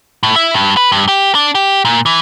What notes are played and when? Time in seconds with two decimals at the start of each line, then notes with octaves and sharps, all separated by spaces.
0.23 A2
0.36 E4
0.54 G2
0.77 B4
0.92 G2
1.08 G4
1.35 D4
1.55 G4
1.85 A#2
2.06 E3